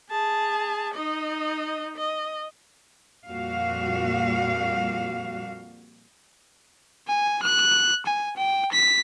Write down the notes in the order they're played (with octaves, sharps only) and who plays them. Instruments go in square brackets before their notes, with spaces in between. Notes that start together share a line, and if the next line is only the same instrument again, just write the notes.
[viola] G#4 A5
D#4 D#5
D#5
[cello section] F2 A#2 G3 F#4 F5
[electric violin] G#5
F#6
G#5
G5
B6